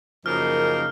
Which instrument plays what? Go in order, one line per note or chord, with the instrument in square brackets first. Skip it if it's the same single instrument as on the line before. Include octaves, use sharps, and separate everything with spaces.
[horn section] F#2 C#3 F3 A#3 D#4 [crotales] F6